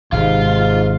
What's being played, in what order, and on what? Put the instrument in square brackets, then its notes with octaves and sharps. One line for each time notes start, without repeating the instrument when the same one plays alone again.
[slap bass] G#1 C3 [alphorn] G#2 [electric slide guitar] F4 [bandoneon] F5